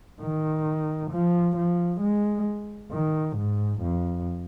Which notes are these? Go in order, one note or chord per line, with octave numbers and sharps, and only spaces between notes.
D#3
F3
F3
G#3
D#3
G#2
F2